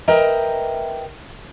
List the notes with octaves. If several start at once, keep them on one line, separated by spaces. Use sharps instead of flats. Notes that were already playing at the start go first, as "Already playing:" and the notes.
A#4 B4 D#5 E5 G5 A#5